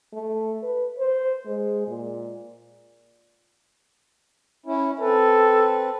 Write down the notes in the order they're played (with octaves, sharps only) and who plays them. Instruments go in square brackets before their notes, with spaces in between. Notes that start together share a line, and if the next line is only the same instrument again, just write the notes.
[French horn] A3
B4
C5
G#3
A#2
[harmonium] C#4 E4
[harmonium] C4 B4 [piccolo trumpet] A4